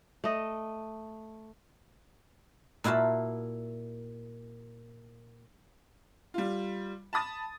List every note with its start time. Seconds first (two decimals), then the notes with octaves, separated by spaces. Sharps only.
0.24 A3 D#5
2.84 A#2 E4 F#4 F5 A5
6.34 G3 F4
7.13 A5 B5 D#6 A6